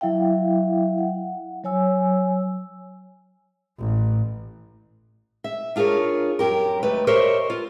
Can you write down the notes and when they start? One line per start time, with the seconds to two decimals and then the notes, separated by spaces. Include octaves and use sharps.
0.01 F#3 E4 E5 F5 G5
0.98 F#5
1.64 F#3 C#5 G#5 E6
3.79 A1
5.44 E5
5.76 D4 F4 G#4 A#4 C#5
6.39 F#2 G4 A#4
6.83 D#2 A3 B4
7.07 G4 A#4 C5 C#5 D#5 E5
7.50 F4